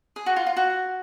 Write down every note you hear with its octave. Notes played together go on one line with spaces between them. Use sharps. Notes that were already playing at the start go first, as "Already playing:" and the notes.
G#4
F#4
F4
F4
F#4